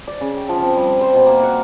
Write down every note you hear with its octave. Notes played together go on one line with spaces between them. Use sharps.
D5
C#3
G5
F3
C4
G3
C5
B2
A#3
F#5